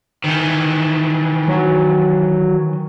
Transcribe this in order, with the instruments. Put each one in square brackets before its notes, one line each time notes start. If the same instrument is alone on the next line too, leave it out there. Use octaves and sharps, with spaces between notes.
[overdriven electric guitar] D#3 E3
[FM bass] F#3